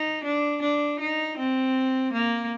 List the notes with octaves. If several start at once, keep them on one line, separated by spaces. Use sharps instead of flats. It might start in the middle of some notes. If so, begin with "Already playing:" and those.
Already playing: D#4
D4
D4
D#4
C4
A#3